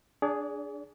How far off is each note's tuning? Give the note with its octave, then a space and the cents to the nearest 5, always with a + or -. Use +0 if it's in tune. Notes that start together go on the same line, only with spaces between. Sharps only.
D4 +0 G#4 +0 D5 -40